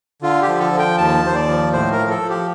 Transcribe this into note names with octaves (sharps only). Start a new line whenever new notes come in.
D3 F4
G4
F3
A4
F3
G5
D#2 A5
D#2 C5
D5
F3
A2 C5
A#4
F3
A4
F3
G4